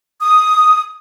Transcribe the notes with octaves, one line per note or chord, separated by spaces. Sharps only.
D#6